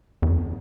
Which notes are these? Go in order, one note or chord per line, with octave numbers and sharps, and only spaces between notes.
E2
F2